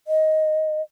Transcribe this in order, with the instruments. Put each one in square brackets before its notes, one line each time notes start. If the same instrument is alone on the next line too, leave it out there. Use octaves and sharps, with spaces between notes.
[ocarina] D#5